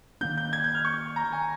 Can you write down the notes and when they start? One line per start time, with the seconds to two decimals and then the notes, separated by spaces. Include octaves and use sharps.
0.21 D#3 A#3 C#4 G6
0.38 G6
0.53 G#6
0.64 G6
0.75 F6
0.85 C#6
1.16 A#5
1.33 G#5